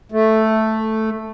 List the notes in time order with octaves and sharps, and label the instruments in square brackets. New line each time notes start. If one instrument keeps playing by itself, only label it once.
[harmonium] A3